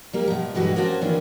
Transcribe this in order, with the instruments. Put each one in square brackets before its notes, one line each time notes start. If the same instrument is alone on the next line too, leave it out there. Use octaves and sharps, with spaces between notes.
[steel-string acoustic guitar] G3 A#3 G4
B2 F3
G2 D3 E3 G#3 F#4 G4
A#3 C4 C#4 F#4 G#5 A5
D#3 E3 A#3 B3 C#4 D4